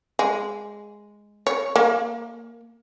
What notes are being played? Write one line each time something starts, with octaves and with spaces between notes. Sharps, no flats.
G#3
C#5
A#3